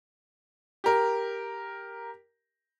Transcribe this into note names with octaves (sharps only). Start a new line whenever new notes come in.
G4 A#4